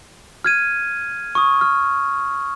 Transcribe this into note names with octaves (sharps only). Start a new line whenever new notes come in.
F6 G#6 D#7
C#6 D#6
F6